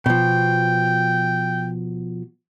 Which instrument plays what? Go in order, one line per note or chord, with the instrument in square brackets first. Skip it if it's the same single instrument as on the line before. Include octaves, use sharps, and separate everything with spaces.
[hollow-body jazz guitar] B2 F3 [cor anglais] G5